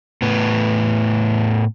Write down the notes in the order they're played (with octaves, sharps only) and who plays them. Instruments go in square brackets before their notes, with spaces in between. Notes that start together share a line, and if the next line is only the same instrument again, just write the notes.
[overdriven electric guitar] A2 B3